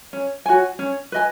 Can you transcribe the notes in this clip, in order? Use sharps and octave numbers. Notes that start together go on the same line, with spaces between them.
C#4
F#4 C#5 G#5
C#4
B4 D#5 G#5